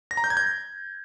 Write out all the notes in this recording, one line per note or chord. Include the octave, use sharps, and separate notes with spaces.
A#6
A#5
G6
G#6
G6